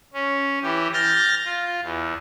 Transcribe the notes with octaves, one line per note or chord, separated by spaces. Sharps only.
C#4
E3 G4
F6 G6 A6 A#6
F4
E2